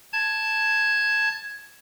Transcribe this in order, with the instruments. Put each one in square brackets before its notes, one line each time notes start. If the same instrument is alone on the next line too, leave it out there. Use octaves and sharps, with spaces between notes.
[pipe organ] A5 G#6